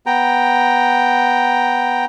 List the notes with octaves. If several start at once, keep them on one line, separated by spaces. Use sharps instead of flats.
B3 G5 A#5